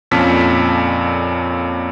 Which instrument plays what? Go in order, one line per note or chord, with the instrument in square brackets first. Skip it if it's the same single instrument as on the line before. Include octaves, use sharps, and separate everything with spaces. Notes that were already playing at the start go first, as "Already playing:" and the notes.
[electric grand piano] F2 A#2 C#4 A5 B6